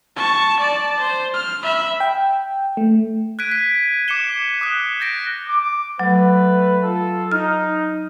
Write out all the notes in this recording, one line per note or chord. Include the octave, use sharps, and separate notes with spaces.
A5 C#6
D5 A5
C5
F6
E5 B5
G5
A3
F#6 G#6 B6 D7 D#7
B6
D6 C7 C#7 E7 G7
D6 D#6 F#6
G6 A6 A#6 D7
D6
F#3 A3 B4
F4 A4
D#4 F6